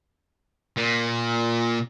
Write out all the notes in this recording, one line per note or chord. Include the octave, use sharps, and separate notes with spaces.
A#2